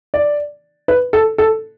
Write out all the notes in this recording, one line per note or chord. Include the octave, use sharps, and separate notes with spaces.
D5
B4
A4
A4